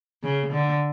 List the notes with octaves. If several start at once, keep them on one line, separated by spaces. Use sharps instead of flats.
C#3
D3